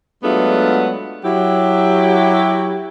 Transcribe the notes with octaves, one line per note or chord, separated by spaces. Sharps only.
F#3 G#3 A3 B3 D4 F4
F#3 E4 G4